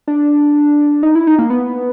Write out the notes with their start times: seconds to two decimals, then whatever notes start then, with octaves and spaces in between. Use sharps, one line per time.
0.08 D4
1.03 D#4
1.15 E4
1.27 D#4
1.39 A#3
1.50 B3